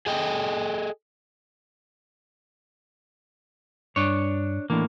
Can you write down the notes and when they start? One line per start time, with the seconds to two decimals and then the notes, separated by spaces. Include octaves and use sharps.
0.06 G#4 A4 D#5 G5
3.96 G2 D4 C#5
4.70 A2 E3 A#3 D4